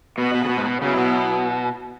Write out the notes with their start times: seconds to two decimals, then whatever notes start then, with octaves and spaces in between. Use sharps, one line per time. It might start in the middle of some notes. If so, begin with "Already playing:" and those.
0.18 B2 B3 F#4 B4
0.34 B2
0.45 C#3
0.49 B2
0.58 G#2
0.65 B2
0.82 C#3 F#3 B3 E4
0.97 B2